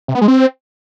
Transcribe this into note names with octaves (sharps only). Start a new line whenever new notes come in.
C3
B3
G#3
C4